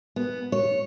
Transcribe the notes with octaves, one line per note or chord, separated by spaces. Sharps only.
B3
C#5